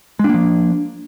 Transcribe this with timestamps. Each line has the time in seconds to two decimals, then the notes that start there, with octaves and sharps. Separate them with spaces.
0.19 G#3
0.24 D4
0.29 A#3
0.34 F3